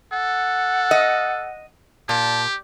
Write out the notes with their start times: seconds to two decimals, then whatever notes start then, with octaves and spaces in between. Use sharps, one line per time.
0.13 A4 F#5
0.91 D#5
2.09 A#2 G4 A5